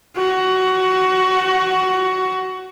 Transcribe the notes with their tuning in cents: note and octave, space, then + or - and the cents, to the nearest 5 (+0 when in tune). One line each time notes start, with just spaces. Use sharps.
F#4 +15